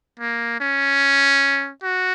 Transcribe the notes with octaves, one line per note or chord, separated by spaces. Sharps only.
A#3
C#4
F#4